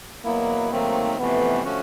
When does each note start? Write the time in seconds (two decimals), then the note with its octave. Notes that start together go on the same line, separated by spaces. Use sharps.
0.25 E2 B2 F#3 A#3 B3 E4
0.72 G#2 D#3 F#3 A3 A#3 C4
1.18 F2 C3 E3 A3 B3
1.65 D3 F3 A3 C#4 F#4